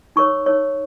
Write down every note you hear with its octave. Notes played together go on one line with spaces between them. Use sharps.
D#4 A#4 C#5 C#6
D#4 A#4 C#5